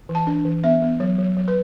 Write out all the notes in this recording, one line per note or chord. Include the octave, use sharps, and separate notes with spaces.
E3
A5
D4
E3
B3 E5
B3
F#3
F#3
F#3
B4